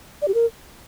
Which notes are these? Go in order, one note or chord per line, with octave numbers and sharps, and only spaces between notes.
D5
G4
A#4